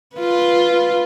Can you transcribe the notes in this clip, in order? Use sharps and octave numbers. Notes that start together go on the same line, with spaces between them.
F4 B4